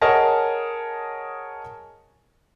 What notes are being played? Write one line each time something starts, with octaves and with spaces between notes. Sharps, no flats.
G#4 A#4 C#5 D#5 F#5 A5